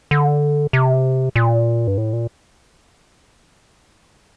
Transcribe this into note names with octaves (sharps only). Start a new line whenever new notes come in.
D3
C3
A#2
G2
A2
A#2